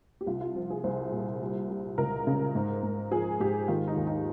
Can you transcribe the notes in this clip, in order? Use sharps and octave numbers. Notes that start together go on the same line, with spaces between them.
G4
C2 F4
F4
F3
G#4
C2 C5
A#2
G3
G3
C#2 A#4
C#3
G#2
G#2
F3 G#4
G#2 G4
D#3 F4
D#4
D#2
D#4